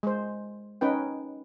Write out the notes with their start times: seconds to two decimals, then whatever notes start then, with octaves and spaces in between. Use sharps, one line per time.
0.03 G#3 C5
0.81 C#4 D#4 B4 G5